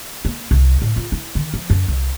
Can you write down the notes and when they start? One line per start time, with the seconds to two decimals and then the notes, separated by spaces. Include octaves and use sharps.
0.25 A#3
0.51 C2
0.82 A2
0.96 F4
1.12 E4
1.35 D#3
1.54 F3
1.70 F#2
1.88 C2